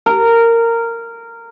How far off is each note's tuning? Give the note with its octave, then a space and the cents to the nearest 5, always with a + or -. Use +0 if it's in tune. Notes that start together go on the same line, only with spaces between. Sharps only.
A#4 -15